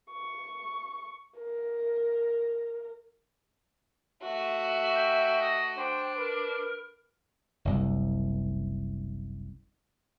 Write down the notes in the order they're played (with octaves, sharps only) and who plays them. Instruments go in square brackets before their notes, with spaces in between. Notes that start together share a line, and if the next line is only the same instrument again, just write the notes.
[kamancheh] C#6
A#4
[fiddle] A3 F#4 [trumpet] E5
[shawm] G5
D#5
[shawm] D4 [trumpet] C5 [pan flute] G5
[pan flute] A#4 [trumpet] B4
[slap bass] F#1 C2